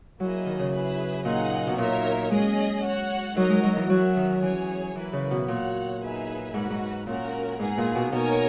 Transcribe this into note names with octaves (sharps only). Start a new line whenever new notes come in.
F#3 A#3 E4 G#4 D#5
D#3
C#3
E4 G#4 B4
A#2 D#4 G#4 D#5 F#5
B2
A#2 D#4 A#4 C#5 E5
G#3 C#4 G#4 D#5
F#4 C#5 F#5
F#3 D#4 A#4 D#5
G#3
F#3
E3
F#3 C#4 F#4 A#4 E5
D#3
E3 C#4 G#4 C#5 G#5
E3 A#3 E4 B4
C#3
B2
A#2 F#4 C#5 F#5
D#4 G#4 B4 E5 G#5
G#2 D#4 F#4 B4
G#2
A#2 C#4 F#4 A#4
G#2 B3 D#4 G#4
A#2
B2
B2 D#4 A#4 C#5 G#5